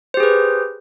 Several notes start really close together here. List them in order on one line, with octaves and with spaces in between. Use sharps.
C5 G4 G#4 B4